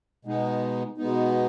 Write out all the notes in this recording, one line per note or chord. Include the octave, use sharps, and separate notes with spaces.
B2 G#3 B3 D#4
B2 G#3 B3 D#4